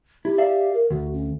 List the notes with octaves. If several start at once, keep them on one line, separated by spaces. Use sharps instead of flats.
E4 G4
D5 E5 F5
A#4
D2 F#4
C#4